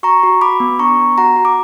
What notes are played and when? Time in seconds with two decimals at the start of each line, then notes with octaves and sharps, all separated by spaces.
0.03 F#4 A#5 C#6
0.23 F#4
0.41 F#4 B5 D6
0.60 B3
0.79 D4 A#5 C#6
0.99 B3
1.18 F#4 F#5 A#5
1.36 F#4
1.45 D6